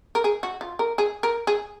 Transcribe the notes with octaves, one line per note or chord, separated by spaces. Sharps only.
A#4
G#4
F#4
F4
A#4
G#4
A#4
G#4